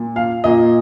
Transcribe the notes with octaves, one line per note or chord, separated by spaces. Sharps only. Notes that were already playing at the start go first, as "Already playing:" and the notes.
Already playing: A#2 A#3
F5
A#2 A#3 D#5